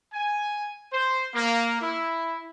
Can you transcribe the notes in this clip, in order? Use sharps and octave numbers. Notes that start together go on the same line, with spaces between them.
G#5
C5
A#3
E4